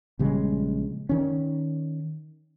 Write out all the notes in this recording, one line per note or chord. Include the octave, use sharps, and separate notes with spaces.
A#1 C#3 G3 G#3
D#3 C#4